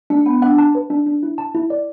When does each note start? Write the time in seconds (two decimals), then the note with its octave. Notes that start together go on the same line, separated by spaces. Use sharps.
0.10 A3 D4
0.26 B3 F#5
0.42 D4 F#5
0.58 A5
0.75 B4
0.90 D4
1.06 D4
1.23 E4
1.38 A5
1.54 E4
1.70 D5